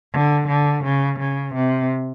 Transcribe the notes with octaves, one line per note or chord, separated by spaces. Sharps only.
D3
D3
C#3
C#3
C3